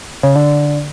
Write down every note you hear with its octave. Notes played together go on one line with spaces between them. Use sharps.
C#3
D3